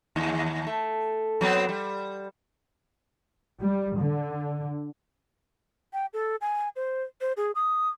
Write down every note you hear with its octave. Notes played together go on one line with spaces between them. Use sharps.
D#2
A3
F#3 B3 C4
G3
G3
D3
G5
A4
G#5
C5
C5
G#4
D#6